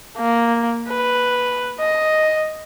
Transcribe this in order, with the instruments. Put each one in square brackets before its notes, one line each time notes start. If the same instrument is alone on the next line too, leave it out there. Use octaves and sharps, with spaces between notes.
[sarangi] A#3
B4
D#5